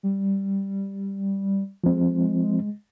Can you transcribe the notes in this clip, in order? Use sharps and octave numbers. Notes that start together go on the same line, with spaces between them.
G3
F3 G#3 C4